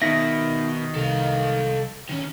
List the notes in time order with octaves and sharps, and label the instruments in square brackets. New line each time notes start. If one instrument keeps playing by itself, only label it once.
[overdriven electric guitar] B2 [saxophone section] D#3 [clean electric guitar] D#4 E5 [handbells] A#6
[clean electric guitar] C2 [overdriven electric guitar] A4 F5
[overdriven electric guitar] D#3 C#4